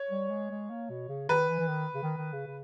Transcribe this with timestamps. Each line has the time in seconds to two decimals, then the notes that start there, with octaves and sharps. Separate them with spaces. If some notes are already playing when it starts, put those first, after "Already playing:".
Already playing: C#5
0.10 G3
0.30 G#3
0.50 G#3
0.70 A#3
0.90 B2
1.09 C#3
1.29 D#3 B4
1.49 E3
1.59 E3
1.68 D#3
1.95 C#3
2.03 D#3
2.17 D#3
2.33 C#3
2.47 C#3